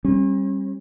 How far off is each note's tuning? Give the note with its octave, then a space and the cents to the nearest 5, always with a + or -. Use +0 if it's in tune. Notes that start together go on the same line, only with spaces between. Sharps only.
G3 +0 C#4 -45